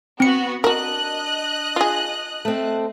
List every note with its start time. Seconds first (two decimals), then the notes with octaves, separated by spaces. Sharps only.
0.20 B3 C4 F#4 C#7
0.64 D4 F#4 A#4 D#5 F#6
1.76 F4 G#4
2.45 A3 C4